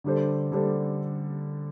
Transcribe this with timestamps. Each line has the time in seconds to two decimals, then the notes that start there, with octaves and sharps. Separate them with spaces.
0.04 D3 G3 D4 A4 C5
0.52 D3 G3 D4 A4 C5